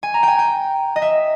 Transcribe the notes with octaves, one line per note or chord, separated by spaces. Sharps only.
G#5
A#5
G5 G#5
G5
D#5
E5